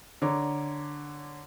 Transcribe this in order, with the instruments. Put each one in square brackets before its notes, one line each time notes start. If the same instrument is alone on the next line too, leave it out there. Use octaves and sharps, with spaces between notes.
[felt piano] D3 C#5 A#5 D6